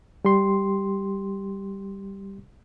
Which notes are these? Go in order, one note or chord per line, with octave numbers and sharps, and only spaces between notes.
G3 G4 C6